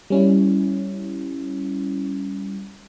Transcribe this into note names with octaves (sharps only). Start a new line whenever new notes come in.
G3 C#4 E4